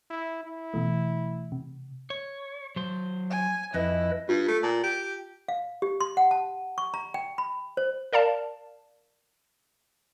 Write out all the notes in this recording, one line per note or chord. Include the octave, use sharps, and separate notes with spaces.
E4
E4
B2 E3 A3
C3
C#5
F#3 C5
G#5
F2 E4 B4 D#5
G2 F4
A3
A#2 A5
G4
F5
G4
C6
F#5
A5
C#6
A#5
G5
B5
C5
A#4 D5 F5 A5